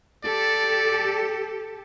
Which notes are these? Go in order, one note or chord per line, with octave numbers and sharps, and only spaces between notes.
G4 A4 D5